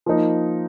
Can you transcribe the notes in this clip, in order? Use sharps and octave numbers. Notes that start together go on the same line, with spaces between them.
F3 A#3 D#4